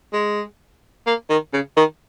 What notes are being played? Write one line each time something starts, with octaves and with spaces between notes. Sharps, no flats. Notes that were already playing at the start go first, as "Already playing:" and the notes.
G#3
A#3
D#3
C#3
D#3